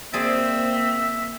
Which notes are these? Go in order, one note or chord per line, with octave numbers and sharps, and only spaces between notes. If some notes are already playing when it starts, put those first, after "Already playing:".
A#3 C4 G#4 C5 D5 E5